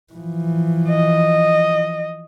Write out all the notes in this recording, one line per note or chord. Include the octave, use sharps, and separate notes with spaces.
E3 F3
D#5